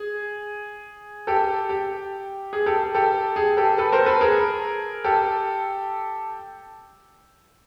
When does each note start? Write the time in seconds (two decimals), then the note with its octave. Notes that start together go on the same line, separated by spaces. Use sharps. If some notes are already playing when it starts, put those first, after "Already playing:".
Already playing: G#4
1.27 G4 A4
1.69 G4
2.53 G#4
2.66 G4 A4
2.95 G4 A4
3.36 G#4
3.57 G4 A4
3.78 A4 B4
3.92 A#4 C5
4.06 A4 B4
4.21 G#4 A#4
5.04 G4 A4